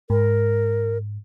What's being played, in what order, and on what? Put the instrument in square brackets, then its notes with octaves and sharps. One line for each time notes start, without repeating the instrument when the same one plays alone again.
[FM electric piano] G#2 [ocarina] A#4